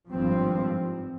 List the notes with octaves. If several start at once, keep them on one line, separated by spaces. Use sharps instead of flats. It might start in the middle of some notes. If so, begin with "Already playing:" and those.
G#1 G2 F3 C4